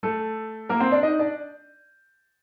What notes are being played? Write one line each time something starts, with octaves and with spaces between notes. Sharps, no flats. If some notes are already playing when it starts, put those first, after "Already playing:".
A3 A4
A#3 A#4
C4 C5
D4 D5
D#4 D#5
D4 D5